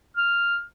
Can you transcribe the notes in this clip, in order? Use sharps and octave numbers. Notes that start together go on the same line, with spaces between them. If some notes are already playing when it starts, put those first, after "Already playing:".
F6